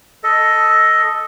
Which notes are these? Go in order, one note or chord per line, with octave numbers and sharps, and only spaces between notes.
A4 D#5